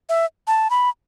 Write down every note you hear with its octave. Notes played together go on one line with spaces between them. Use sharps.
E5
A5
B5